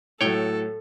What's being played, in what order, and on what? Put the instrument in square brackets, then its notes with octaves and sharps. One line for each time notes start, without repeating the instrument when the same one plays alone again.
[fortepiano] A2 F#3 [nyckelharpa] A4 [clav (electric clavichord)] C#5 G5